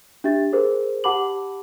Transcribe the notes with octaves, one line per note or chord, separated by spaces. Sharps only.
D4 G4 E5 A6
G#4 A#4 C5
G4 F#5 A5 B5 D6 F#7